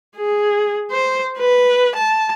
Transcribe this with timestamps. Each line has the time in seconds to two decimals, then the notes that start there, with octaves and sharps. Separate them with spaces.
0.16 G#4
0.91 C5
1.38 B4
1.96 A5